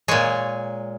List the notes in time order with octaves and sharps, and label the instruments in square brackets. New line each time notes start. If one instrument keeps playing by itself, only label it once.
[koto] A#2 G#3 C#5